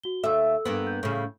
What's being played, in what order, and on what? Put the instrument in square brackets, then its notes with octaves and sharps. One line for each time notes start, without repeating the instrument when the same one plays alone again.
[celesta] F#4 G7
[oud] D#2 E5 [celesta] A4 E6
[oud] G2 A#3 B3
[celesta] G6
[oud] A2 C#3